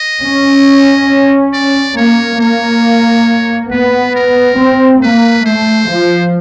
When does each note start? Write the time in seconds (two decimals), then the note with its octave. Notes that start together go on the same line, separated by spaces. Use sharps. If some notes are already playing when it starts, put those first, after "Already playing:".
Already playing: D#5
0.23 C#4
1.53 D5
1.97 A#3 C#5
2.40 A#3 C#5
3.71 B3 B4
4.15 A#4
4.58 C4
5.03 A#3 B4
5.46 A3 C5
5.90 F3